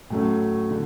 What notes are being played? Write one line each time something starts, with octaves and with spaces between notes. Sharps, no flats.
A2 F#3 A3 C#4
D3